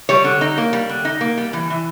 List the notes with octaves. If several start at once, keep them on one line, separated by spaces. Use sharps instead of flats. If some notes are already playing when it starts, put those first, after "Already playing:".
G3 C#5
D3
D#4
A#3
G3
D3
D#4
A#3
G3
E3
E3